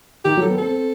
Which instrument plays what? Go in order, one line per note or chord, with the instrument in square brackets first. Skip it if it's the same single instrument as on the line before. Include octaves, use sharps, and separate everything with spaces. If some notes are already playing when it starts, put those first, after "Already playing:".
[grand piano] D#3 [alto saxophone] G4
[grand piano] F#3
[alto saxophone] A4
[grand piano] B3
[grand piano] C4 [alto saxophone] A4